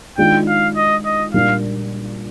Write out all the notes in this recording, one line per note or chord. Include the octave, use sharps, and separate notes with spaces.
D#3 G#3 D4 F4 G5
F5
D#5
D#5
A#2 G3 A#3 D4 F5